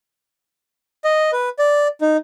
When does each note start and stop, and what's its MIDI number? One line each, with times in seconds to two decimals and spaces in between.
1.04 1.31 75
1.32 1.49 71
1.59 1.88 74
2.01 2.17 63